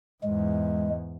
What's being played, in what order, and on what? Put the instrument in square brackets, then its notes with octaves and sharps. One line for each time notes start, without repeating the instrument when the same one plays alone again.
[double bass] E2 G#2 [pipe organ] G#3